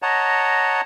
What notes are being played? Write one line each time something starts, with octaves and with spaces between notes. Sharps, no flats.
C#5 D#5 F#5 A5 A#5